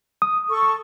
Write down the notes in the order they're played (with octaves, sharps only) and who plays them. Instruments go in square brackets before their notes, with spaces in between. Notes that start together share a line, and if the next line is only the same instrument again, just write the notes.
[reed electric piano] D#6
[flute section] A4 C#6